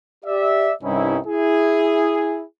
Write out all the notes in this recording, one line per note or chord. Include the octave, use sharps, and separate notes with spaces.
G4 D5 E5
C2 G2 C#4 D#4 E4
E4 G#4